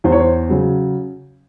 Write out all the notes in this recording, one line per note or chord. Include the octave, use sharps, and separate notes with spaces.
E2 C5
C#5
C5
C#3 F#3